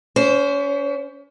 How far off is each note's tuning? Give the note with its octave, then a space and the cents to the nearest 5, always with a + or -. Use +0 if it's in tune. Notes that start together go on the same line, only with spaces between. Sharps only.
C#4 +35 C5 +0